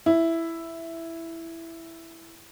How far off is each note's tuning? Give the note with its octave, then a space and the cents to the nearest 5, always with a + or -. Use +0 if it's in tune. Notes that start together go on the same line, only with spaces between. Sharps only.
E4 +5